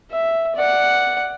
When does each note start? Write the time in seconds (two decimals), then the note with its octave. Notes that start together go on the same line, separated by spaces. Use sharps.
0.11 E5
0.56 D5 F#5